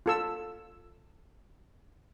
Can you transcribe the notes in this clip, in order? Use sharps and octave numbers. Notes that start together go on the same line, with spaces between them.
F4 A4 E6